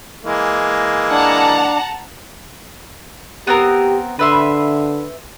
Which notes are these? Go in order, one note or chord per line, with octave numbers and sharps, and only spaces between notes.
E3 G#3 A#3
D4 F#5 A5 A#5
B3 C4 G4 A#4
D3 B4 E5 C6